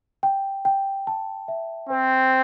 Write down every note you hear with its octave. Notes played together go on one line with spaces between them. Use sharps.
G5
G5
A5
E5
C4 C5